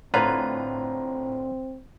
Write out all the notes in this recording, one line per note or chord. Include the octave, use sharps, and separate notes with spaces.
A2 D3 C4 F4 B4 C5 A#5 G#6